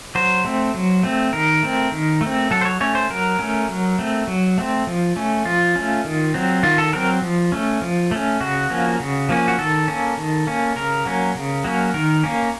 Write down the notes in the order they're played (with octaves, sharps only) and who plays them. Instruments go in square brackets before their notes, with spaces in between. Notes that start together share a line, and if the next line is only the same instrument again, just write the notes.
[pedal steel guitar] F#3 C5
A3 C4
F#3
A3 C4
D#3 A#4
A3 C4
D#3
A3
C4
F#3 A4
C5
C#5
A3 C#4 C#5
C5
F#3 A#4
A3 C#4
F#3
A3 C4
F#3
A3 C4
F3
A3 C#4
F3 F4
A3 C#4
D#3
F#3 C4
D#3 F4
A4
F#3 C4 A#4
F3
A3 C#4
F3
A3 C#4
C#3 F#4
F3 A#3 C#4
C#3
F3 A#3 C#4
F#4
D#3 A4
A#3 C#4
D#3
A#3 C#4
C#3 A#4
F#3 A#3 C#4
C#3
F#3 A#3 C#4
D#3 A#4
A#3 C#4